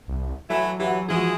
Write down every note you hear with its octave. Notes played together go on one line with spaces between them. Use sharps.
C2
E3 F#3 A3 E4
E3 G4 F#5
E3 F3 G#3 E4 F#4 G#4